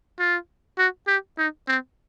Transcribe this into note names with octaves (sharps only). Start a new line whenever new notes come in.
F4
F#4
G4
D#4
C4